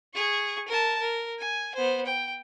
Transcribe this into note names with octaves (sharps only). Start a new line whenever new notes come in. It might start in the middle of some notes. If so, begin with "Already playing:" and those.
G#4 C#6
A#4 A5
A#4
G#5
B3 C5
G5